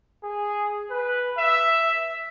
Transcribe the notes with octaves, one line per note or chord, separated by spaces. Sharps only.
G#4
B4
E5